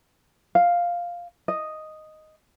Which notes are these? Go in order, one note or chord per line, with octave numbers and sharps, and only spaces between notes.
F5
D#5